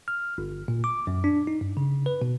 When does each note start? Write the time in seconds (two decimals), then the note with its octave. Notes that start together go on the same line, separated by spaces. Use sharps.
0.08 F6
0.38 G1
0.68 A#2
0.84 D6
1.07 F#2
1.24 D4
1.47 D#4
1.61 G2
1.77 C#3
2.06 B4
2.22 B2